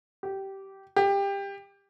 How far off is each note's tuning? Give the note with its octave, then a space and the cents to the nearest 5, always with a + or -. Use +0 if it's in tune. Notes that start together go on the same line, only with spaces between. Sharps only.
G4 -15
G4 +20